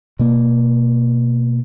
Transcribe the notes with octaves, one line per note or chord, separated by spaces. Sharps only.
B2 A#3